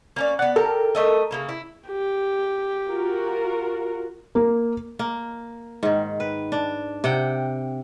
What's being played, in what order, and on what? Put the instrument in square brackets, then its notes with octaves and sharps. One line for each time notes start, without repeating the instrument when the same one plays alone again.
[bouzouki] A#3 C#4 D5
[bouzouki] B3 D5 [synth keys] F#5
[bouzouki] G4 [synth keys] A4 A#4
[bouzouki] A3 D#5 E5
C#3 A#3 E4
E4
[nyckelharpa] G4
[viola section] F4 F#4 A#4
[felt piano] A#3
[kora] A#3
G#2 D#3
B4
D4
C3 F#5 G5